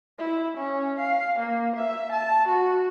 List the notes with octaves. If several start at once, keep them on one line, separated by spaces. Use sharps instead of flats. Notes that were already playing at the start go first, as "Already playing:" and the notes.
E4
C#4
F5
A#3
E5
A5
F#4